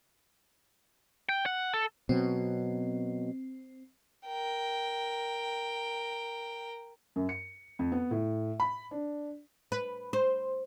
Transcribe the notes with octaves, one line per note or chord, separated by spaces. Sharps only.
G5
F#5
A4
B2 F#3 C4
A#4 G5
F#2
C#7
F2
B3
A2
B5
D4
B4
C5